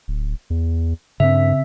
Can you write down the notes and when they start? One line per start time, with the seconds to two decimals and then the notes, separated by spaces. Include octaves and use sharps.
0.08 D1
0.50 E2
1.20 G2 C#3 C4 E5